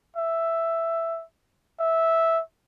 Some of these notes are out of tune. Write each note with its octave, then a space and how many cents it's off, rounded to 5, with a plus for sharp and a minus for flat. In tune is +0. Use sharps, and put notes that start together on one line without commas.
E5 +5
E5 -10